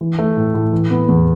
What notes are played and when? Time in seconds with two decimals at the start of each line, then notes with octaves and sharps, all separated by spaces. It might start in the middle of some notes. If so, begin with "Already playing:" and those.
0.01 E3
0.19 A3
0.37 A2
0.54 A2
0.72 E3
0.90 B3
1.09 E2